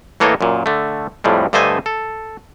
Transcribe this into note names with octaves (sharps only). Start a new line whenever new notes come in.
A2 E3 A#3 A4 C#5 D#5
F#2 A#2
D3 A3
F2 A2 G3 G#3
G2 D3 A3 C5 D#5 G#5
A4